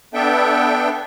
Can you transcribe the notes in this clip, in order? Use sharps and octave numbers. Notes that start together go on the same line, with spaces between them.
B3 D4 A4 E5 G5